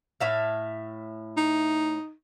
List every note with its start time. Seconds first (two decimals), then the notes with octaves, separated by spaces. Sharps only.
0.20 A2 E5 F5
1.37 D#4